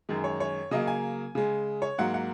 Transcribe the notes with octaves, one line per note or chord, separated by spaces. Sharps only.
F#2 D#3 G#3
C#5
C#5
C#3 F#3 A#3 D#5
G#5
C#3 G#3
C#5
G#2 F#3 A#3 F#5
F#5